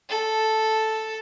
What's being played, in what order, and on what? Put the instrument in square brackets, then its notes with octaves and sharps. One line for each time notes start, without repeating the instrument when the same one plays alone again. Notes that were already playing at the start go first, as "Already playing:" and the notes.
[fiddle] A4